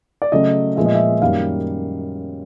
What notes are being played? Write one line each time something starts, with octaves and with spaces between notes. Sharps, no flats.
D5
C#3 F#3 A3 C#4 D#5
A#2 F3 G#3 B3 E5
D#5
E5
F#2 D#3 G3 A#3 F5